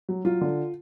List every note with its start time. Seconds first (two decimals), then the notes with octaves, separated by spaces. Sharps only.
0.09 F#3
0.25 F#3 F4
0.41 D3